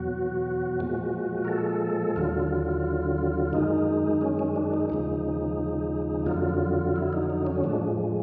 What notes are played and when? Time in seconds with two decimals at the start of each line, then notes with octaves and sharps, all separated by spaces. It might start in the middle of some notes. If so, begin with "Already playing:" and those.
Already playing: E2 B2 F#3 F#4
0.80 A#2 F3 G#3
1.45 A#4
1.48 A4
2.16 D#2 D3 F#3 F4
3.53 F#2 D#3 G#3 D#4
4.21 C#4
4.39 C#4
4.56 D4
4.74 D#4
4.90 D#2 C#3 F3 G#3 D#4
6.26 F2 D3 F#3 F4
6.96 E4
7.13 D#4
7.30 D#4
7.47 C#4
7.64 A2 F3 G#3 D4